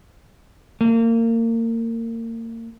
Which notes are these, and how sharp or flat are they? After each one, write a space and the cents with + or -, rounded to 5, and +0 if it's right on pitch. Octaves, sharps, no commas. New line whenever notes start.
A#3 -30